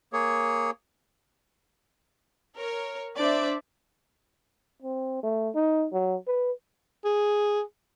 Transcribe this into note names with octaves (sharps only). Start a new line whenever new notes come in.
A#3 G#4 C#5
A#4 C#5
D4 C5 D5 E5
C4
A3
D#4
F#3
B4
G#4